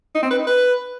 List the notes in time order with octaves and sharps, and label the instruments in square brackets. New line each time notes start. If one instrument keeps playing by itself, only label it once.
[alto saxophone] D#4
C4
B4
D#4
B4